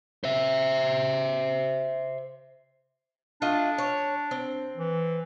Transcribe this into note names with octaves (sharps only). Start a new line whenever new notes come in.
C5 E5
A3 D4 F4 D#5
C#5
C4
E3